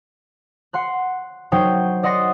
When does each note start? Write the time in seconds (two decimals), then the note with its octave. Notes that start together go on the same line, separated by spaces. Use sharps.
0.73 F#5 C6 F#6
1.52 F#3 D#4 C5 G5 D#6
2.03 D5 D#5 F#5 C6 D#6 A#6